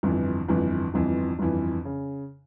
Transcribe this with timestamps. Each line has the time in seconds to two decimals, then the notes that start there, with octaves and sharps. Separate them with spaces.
0.03 G1 F2 E3
0.48 G1 F2 E3
0.94 G1 F2 E3
1.39 G1 F2 E3
1.85 C#3